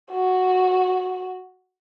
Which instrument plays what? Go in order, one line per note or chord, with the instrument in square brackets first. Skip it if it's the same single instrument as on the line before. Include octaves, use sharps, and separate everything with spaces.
[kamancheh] F#4